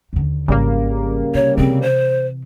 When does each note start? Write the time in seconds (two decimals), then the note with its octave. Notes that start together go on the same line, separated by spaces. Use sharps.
0.13 D#2 D3
0.48 G#1 C#3 G3 A#3
1.35 C3 C#5
1.57 C3 E3 C4
1.82 C5